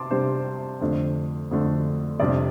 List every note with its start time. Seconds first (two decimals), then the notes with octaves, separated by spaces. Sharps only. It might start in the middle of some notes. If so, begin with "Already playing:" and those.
Already playing: C3 A5 C6 D6
0.11 C3 G3 D4 C5
0.81 F2 D3 A3 D4
1.51 F2 D3 A3 D4
2.20 F2 C3 G3 D4 D5